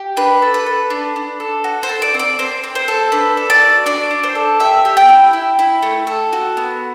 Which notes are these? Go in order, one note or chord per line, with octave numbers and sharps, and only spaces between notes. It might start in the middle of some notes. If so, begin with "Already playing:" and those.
Already playing: G4
D4 B4
A4
B4
A4
D4
D4
A4
F#4
C5
A4
D5
C4
D5
C4 C5
C4
C5
A4
D4 B4
A4
D5
F#4
D4 D5
D4
C5
A4
G4 E5
G4
G5
E4
E4
E4
A3
A4
F#4
B3